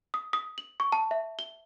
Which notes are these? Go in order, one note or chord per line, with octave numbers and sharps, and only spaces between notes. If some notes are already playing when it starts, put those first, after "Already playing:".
D#6
D#6
F#7
C#6
A5
E5
G7